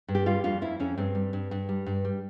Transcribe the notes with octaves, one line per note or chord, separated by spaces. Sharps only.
G2
G4
G3 F4
F2 F4
F2 E4
F2 C#4
G2 C4
G3
G2
G2
G3
G2
G3